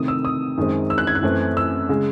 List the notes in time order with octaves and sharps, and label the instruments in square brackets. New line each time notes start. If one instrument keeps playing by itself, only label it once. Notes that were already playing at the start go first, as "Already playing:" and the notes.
Already playing: [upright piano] C3 D#3 A3 D#6
E6
D#6
F#2 D#3 G#3 C4
E6
F#6
G#6
F#6
F#2 E3 A3 C4
E6
C#3 G#3